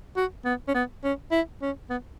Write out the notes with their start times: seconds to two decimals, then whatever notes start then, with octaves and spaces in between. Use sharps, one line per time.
0.17 F#4
0.45 B3
0.68 C#4
0.75 B3
1.04 C#4
1.32 E4
1.62 C#4
1.90 B3